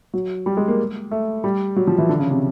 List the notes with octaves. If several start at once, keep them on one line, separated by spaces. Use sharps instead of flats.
F#3
G3
G#3
A#3
A3
G3
F#3
F3
E3
D3
C#3
C3